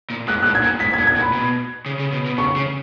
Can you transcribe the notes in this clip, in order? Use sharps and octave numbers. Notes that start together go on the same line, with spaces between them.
A#2
G#2 F#6
A#2 F#6
G#6
A#2
G#2 B6
G#6
A#2
G#6
A#2
B5
B2
C#3
C#3
B2
B2
C#3 C#6
C#3